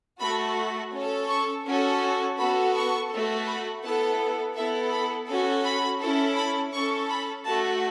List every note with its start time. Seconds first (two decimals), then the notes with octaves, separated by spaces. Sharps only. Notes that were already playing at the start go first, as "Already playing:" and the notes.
0.20 A3 F#4 A4 B5
0.92 C#4
0.98 A4
1.29 C#6
1.65 C#4 F#4 A4
2.37 B3 F#4 A4 B5
2.74 C#6
3.10 A3 F#4 A4
3.46 B5
3.83 B3 E4 A4 A5
4.55 B3 E4 A4 E5
4.92 B5
5.28 C#4 F#4 A4
5.64 B5
6.00 C#4 E4 A4
6.36 B5
6.73 C#4 A4 C#6
7.09 B5
7.45 A3 F#4 A4 A5